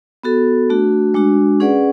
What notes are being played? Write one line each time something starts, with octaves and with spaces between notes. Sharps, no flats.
B3 F#4 A4
A3 D4 F#4
G#3 D4 F#4
C#4 G#4 B4 D5 F#5